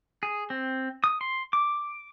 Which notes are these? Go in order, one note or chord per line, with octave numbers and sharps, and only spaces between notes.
G#4
C4
D#6
C6
D6